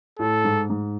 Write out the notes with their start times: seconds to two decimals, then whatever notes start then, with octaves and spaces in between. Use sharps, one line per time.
0.19 A2 A4
0.44 G#2
0.70 G#2